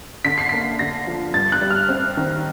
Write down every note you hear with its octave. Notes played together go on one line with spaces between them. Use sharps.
D3 B6
C7
A#3 B6
D3 A#6
F3
G2 A6
F#6
G3
F6
C4
D#3